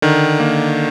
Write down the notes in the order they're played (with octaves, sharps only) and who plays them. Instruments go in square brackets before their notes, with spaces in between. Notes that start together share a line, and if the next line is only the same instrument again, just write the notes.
[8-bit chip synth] D3 [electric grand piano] D#3
[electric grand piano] A#3